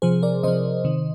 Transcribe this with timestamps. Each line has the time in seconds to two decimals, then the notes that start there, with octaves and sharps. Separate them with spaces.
0.02 C3 F3 G#4 C5
0.22 A#4 D5
0.43 C3 F3 C5 D#5
0.84 C3 D#3